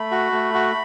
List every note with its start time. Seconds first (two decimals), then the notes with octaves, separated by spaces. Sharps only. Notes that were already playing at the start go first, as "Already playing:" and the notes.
Already playing: A3 B5
0.11 F#4
0.32 A3
0.54 F#4